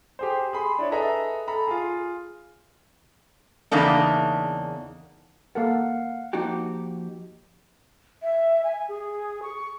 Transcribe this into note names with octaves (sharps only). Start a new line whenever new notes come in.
G4 G#4 C5
G#4 B5 C6
D4 E4 C#5
G#4 A4 B4 D#5 E5 A#5
A4 A#5 B5
F4 G#4
E2 C#3 A#3 D4 D#4
A#3 A4 A#4 F5 F#5
F3 A#3 D#4 F#4 G4
E5
G#5
G#4
C#6